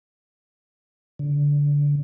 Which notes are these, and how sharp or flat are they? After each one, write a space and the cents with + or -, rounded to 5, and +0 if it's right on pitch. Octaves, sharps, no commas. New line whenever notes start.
D3 -20